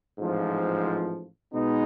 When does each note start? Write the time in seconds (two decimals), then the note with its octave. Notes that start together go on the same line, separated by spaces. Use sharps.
0.19 A1 G#2 F3
1.54 B2 G#3 B3 D#4